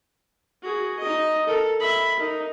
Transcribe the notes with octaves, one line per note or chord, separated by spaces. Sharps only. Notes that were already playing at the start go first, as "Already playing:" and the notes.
F#4 G#4
D#4 D#5
A4 A#4
E5 B5
D#4 A#4